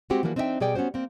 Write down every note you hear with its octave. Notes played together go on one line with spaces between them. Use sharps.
G#3 C4 F#4 G4
E3 F3 G3 A#3 F4 F#4
C4 D4 D#4 D#5 E5 G5
B2 G3 G#4 D5 G5
B3 C#4 D4 F#4 C5
A#3 C4